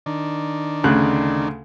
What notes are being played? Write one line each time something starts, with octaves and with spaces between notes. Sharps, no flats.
D#3 D4
D2 C#3 F#6